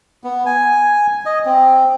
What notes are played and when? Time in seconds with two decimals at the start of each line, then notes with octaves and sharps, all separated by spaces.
0.24 B3
0.46 G#5
1.26 D#5
1.45 C4